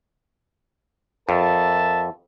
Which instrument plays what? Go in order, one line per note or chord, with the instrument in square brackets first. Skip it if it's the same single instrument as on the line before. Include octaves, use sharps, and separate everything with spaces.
[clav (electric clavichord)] F2 [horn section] A#4 E5 A5